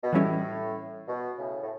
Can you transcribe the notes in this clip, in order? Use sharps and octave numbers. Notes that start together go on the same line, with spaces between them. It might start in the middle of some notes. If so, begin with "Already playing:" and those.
B2
A2 E3 G3 C#4 E4
B2
A2 C#3
A2